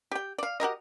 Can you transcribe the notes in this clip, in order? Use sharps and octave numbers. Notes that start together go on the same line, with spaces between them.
G4 G5
D5 F5
F#4 G4 A#4 D#5